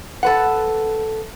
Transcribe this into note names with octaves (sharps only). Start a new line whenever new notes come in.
A4 B4 F#5